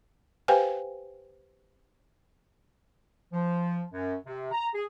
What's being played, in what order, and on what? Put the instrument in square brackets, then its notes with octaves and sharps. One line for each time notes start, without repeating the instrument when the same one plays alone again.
[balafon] G4 B4 C5 F5 G5 G#5
[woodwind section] F3
F#2
C3
A#5
G#4